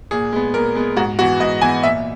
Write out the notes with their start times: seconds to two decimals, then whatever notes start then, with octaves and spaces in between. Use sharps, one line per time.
0.11 A#2 G#4
0.33 G#3 B3
0.54 A#2 A#4
0.75 G#3 B3
0.97 G#2 F#4
1.19 E3 B3 F#4
1.40 G#2 D#5
1.61 E3 B3 G#5
1.83 A#2 E5